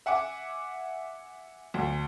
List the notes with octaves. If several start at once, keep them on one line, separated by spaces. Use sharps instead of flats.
E5 F#5 G#5 D6
D2